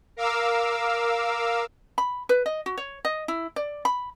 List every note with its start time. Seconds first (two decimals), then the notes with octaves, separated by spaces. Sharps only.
0.17 A#4 F5 D6 E6
1.98 B5
2.29 B4
2.46 D#5
2.66 F#4
2.78 C#5
3.05 D#5
3.28 E4
3.56 D5
3.85 B5